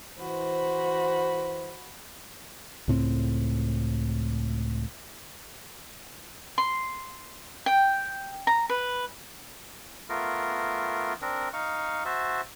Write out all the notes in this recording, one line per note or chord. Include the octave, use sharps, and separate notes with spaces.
E3 F#4 C5 B5
C#2 A2 C4
C6
G5
A#5
B4
A3 B3 F4 A#4
C4 D4 A#4
D#4 F5 C#6
F#4 C5 E5 A5